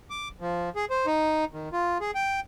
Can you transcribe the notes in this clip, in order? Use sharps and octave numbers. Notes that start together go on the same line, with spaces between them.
D6
F3
G#4
C5
D#4
D#3
F4
G#4
G5